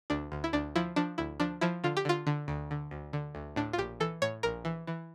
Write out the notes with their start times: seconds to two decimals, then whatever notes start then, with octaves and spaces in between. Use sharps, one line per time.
0.10 D2 D4
0.32 D2
0.44 E4
0.53 D2 D4
0.76 F3 E4
0.96 F3 D4
1.18 D2 E4
1.40 F3 D4
1.61 F3 E4
1.84 D3 F4
1.97 G4
2.05 D3 F4
2.27 D3
2.48 D2
2.71 D3
2.91 D2
3.13 D3
3.35 D2
3.56 A2 D4
3.73 F4
3.78 A#1 G4
4.00 E3 A4
4.22 A2 C#5
4.43 A#1 A#4
4.65 E3
4.87 E3